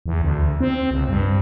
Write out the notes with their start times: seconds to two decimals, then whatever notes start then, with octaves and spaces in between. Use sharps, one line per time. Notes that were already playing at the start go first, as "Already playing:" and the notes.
0.06 E2
0.22 D2
0.60 C4
0.91 C#2
1.09 G2